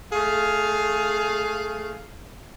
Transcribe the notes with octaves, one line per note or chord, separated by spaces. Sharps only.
A3 G#4 F5